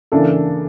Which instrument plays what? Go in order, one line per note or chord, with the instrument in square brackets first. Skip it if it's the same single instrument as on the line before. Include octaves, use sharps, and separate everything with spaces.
[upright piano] C#3 E3 A#3 D4 A4